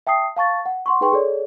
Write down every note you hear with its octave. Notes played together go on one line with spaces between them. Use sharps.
E5 G5 A5 D#6 C7
F5 A5 C#6 A6
F#5
F#5 C6 C#6
D#4 G#4 B4 G5 C6 C#6
G#4 A4 C#5 D5